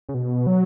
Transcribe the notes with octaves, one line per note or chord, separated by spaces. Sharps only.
C#3
B2
F#3